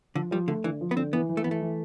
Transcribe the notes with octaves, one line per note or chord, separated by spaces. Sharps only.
D3 F3
F3 G3
D3 A3
D3 E3
F3
B3
D3 C4
E3 B3
E3
A3
E3 B3
A3
E3